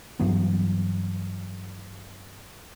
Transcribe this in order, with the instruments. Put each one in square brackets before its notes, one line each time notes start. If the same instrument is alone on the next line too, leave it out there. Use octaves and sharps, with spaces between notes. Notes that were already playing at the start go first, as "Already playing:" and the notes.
[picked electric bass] G2 E3 F#3 B3